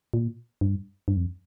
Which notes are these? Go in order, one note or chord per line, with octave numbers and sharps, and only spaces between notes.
A#2
G2
G2
F2